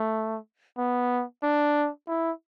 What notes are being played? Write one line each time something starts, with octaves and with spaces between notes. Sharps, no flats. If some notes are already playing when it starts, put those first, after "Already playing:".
Already playing: A3
B3
D4
E4